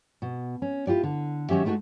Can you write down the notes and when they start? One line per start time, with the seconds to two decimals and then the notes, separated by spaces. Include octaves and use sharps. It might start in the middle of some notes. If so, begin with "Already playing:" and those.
0.22 B2
0.62 C#4
0.87 E4 F4 G4 D5
1.03 D3
1.49 D#3 F#3 C#4 G4 E5
1.65 G#3 A3 D#4 F4 F#4